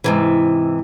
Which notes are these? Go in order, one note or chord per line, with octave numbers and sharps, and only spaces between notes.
G#2 C3 E3